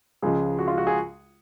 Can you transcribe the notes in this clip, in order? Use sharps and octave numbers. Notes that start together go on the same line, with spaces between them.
C#2 C#3 F3 G#3 G#4
F#4
F4
F#4
G#4